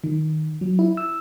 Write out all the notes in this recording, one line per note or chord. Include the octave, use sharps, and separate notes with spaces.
D#3
F#3
E4
E6